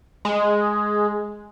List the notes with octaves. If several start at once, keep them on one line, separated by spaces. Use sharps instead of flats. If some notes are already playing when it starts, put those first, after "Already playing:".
G#3